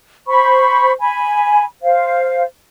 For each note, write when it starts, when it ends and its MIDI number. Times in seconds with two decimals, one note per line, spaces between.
0.27 0.92 72
0.27 0.92 83
0.27 0.92 85
1.00 1.63 80
1.00 1.63 83
1.83 2.43 72
1.83 2.43 77